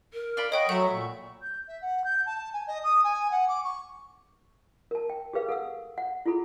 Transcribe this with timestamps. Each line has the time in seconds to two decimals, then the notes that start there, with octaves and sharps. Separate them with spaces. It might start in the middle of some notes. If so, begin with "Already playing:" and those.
0.13 A#4
0.37 F4 D5 B5
0.52 C#5 D#5 F#5 G5 B5 C#6
0.69 F#3 A3 E5 F#5 B5
0.91 A#2
1.42 G6
1.67 E5
1.81 F#5
2.04 G6
2.26 A5
2.53 G#5
2.67 D#5
2.83 D#6
3.04 G#5
3.31 F#5
3.48 D6
3.64 C#6
4.91 A#4 A5
5.10 G5
5.33 G4 G#4 A#4 B4 F5
5.49 A4 F#5 E6
5.98 F#5
6.26 E4 F4 G#4 A4 B5